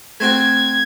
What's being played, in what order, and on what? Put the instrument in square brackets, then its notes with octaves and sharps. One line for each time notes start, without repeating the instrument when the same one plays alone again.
[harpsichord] A3 C4 F#4 [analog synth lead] G#6